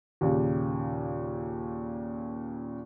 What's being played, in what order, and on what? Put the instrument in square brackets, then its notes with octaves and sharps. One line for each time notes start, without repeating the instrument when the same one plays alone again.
[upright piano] D#2 A#2 C#3